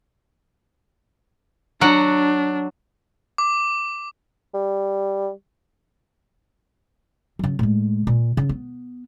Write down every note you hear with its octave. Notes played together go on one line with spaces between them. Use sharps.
F#3 D4 F#5
D6
G3
C#3 F#3
A2 G#3
A#2
C#3
B3